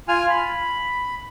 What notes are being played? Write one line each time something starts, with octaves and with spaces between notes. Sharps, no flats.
F4 G#5 F6
B5